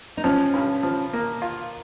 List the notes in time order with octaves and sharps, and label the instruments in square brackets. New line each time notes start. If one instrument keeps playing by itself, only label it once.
[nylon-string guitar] D#4
[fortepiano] F3 [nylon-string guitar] C#4
[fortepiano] G2
F3
A#3
F4